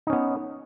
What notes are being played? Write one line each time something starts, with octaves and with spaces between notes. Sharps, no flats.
B3 C#4 D#4